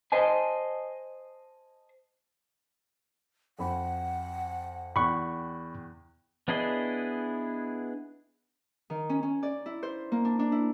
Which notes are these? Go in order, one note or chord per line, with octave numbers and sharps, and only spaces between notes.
C5 D#5 G#5 A5
F2 F#5 B5
E2 G5 B5 C#6 F#6
B3 D4 E4 G#4 D#5
D#3
C#4
C#4
D5
E4
C5
A#3
D4
D4
E4